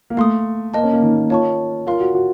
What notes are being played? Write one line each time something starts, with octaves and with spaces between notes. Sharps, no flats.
A#3
A3 F5 C6 D#6
A#3 A#4 D#5 A5
C#4
A#3
D#3
A#3
F4 C#5 A5 C#6
F4 A#4 F5 C6
F#4
F#4